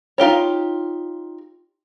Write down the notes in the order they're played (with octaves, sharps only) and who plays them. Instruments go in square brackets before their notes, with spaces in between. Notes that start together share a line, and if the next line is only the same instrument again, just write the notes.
[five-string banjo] D#4 F4 G4 C#5